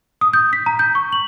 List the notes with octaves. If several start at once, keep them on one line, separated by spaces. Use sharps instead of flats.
D#6
G6
B6
A#5
G6
C#6
F#7